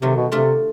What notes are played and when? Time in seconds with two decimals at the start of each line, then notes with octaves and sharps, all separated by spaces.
0.02 C3 D#3 F#3 A3
0.17 B2
0.32 C3 A3 D4 F4 A4